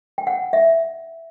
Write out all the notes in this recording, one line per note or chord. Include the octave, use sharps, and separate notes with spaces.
G5
F#5
E5